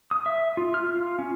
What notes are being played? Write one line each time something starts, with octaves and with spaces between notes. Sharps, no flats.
D#6
E5
F4
F6
F4
C#4